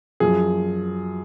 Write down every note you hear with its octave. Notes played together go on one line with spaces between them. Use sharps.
F#2 F3 G#4